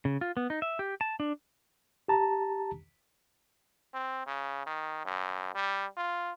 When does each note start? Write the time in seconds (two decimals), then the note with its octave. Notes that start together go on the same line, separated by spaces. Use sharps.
0.05 C#3
0.21 F4
0.37 B3
0.50 D#4
0.62 E5
0.79 G4
1.01 A5
1.20 D4
2.08 G4 A5 A#5
3.94 C4
4.27 C#3
4.67 D#3
5.05 F#2
5.55 G3
5.97 F4